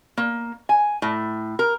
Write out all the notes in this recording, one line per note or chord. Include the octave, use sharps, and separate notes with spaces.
A#3
G#5
A2
A#4